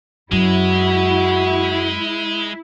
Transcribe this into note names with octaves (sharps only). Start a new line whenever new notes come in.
F#2 G#3 E4 F#4